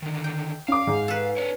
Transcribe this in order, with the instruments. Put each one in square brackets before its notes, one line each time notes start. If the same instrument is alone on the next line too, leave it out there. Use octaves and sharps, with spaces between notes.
[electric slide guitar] D3 D#3
[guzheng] G5
[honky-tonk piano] C#4 D6 [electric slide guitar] F5
[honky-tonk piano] G#2
[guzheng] A4 B4
[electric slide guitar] D4 C#5